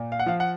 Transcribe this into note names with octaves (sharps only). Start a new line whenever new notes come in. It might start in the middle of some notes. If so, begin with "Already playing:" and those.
Already playing: A#2
F5
F#5
F3 F5
F#5